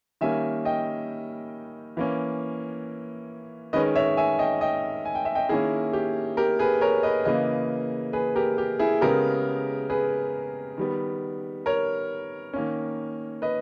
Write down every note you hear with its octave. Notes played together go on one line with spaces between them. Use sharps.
D#3 G3 A#3 C#4 E5 G#5
D#5 G5
E3 A#3 C#4
D#3 G#3 C#4 B4 D#5
C#5 E5
E5 G#5
D#5 G5
D#5 G5
G#5
G5
E5
D#5 G5
D#3 A#3 C#4 E4 G#4
G4
G4 A#4
G#4 B4
A#4 C#5
B4 D#5
C#3 E3 A#3 B4 D#5
G#4 B4
G4 A#4
G4
E4 G#4
C#3 G#3 B3 G4 A#4
G#4 B4
D#3 G3 B3
A#4 C#5
D#3 A#3 C#4
B4 D#5